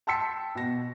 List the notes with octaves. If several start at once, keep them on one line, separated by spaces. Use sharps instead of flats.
G5 A5 C6 E6 B6 C#7
B2 A#6